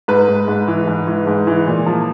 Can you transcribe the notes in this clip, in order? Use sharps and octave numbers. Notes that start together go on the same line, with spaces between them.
G#2 B4
G#2
G#2
E3
G#2
E3
G#2
E3
A#2
F3